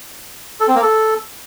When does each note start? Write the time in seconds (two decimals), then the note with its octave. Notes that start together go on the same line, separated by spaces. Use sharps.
0.60 A4
0.68 C4
0.75 A#3
0.83 A4